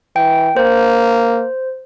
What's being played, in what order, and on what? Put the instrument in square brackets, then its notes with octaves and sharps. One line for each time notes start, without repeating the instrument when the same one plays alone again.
[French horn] E3 [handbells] G5
[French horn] A#3 [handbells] C5